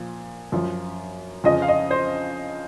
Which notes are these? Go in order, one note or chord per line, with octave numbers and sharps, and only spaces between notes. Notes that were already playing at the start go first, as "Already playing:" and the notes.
Already playing: A#2 F3
F#2 F3
F2 C#3 F3 D#5
F5
D#5
C5